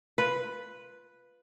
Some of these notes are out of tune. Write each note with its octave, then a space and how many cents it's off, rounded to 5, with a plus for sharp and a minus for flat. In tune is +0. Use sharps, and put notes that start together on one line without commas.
F4 +0 B4 +0